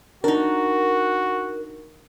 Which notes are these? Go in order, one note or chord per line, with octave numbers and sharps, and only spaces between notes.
D4 D#4 F#4 A#4